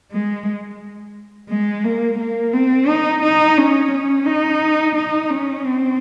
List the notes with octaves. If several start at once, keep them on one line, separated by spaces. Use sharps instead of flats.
G#3
G#3
A#3
A#3
C4
D#4
D#4
C#4
C#4
D#4
D#4
C#4
C4